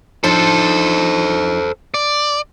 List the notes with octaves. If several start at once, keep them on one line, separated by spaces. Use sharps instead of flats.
F3 D4 D#4 A4 C5
D5